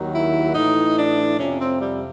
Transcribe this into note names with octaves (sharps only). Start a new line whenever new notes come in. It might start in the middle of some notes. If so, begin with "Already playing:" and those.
Already playing: D#2 D#3 F#3
E4
A2 E3 D#4
D4
F2 C3 F3 C#4
C4
G3